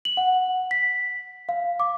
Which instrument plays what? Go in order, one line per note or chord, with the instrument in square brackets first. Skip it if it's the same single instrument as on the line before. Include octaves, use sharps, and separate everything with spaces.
[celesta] F#7
F#5
B6
F5
D6